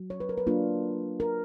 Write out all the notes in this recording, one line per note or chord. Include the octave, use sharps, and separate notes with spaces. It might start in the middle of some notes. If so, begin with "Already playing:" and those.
Already playing: F#3
C#5
B4
A#4
B4
F#3 A#3 D4 F4
A#4